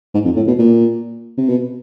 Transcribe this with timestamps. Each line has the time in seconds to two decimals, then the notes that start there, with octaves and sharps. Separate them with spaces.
0.14 G#2
0.25 F2
0.36 A2
0.48 B2
0.59 A#2
1.38 C3
1.49 B2